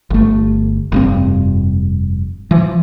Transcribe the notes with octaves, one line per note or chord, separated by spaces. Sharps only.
G1 A3
F1 G2 C4
E3 F3